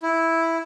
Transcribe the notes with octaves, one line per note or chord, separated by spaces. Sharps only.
E4